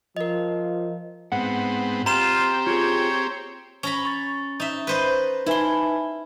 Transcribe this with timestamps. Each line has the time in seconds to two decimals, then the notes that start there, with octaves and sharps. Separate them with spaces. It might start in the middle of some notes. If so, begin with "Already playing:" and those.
0.16 F3 A#4 D#5
1.32 G#2 B3 C4 F#5
2.06 C4 F4 G4 A#5 C6 E7
2.67 F4 G#4 C#5
3.83 C#4 A#5 B5
4.05 C#6 A6
4.60 D#4 E5
4.87 B4 C5 D#5
5.46 D#4 E4 B4 G#5 C6